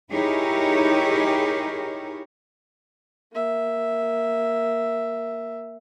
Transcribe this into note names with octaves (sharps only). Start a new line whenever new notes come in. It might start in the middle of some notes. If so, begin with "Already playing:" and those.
D#4 E4 G4 G#4 A#4 C#5
A#3 E5